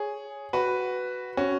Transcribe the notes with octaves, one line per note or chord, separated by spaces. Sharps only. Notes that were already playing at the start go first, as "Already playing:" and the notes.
Already playing: G#4 C#5
F#4 B4
C#4 F#4